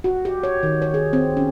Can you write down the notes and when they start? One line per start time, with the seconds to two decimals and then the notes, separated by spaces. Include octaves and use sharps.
0.04 F#4
0.25 G4
0.43 C#5
0.63 D#3
0.82 C#5
0.94 G#4
1.13 C4
1.37 C#4